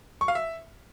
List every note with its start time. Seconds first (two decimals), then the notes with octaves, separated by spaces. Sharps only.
0.21 C#6
0.28 F5
0.35 E5